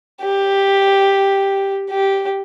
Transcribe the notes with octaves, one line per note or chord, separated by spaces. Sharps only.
G4
G4